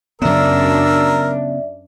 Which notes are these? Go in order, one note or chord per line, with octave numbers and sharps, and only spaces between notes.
F#2 C#3 B3 D4 A#4 D5 E5 E6